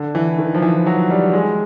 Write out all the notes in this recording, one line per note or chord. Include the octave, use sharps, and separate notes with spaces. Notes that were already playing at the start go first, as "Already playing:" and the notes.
Already playing: D3
E3
D#3
F3
E3
F#3
G3
G#3